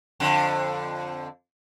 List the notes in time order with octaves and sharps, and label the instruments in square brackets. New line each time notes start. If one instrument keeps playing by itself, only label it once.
[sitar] F2 D3